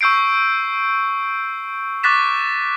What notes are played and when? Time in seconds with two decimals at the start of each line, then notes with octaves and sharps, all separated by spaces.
0.01 C#6 E6 G6 C7 D7
2.03 C#6 D6 F#6 A6 B6 E7